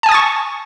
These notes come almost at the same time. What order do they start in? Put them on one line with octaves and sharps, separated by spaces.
A5 G#5 D#6 A6 C#6